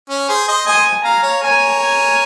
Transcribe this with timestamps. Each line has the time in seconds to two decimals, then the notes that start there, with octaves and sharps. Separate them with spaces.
0.10 C#4
0.29 G#4 C5
0.48 C5 D#5
0.66 C5 D#5 G#5
1.04 F5 G#5 A#5
1.23 C#5 F5
1.43 A#4 C#5 G#5
1.80 G#5